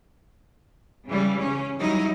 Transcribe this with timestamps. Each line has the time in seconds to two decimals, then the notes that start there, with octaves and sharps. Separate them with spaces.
1.07 C#3 E3 G3
1.40 C#3 C#4
1.79 F#3 G3 D#4 E4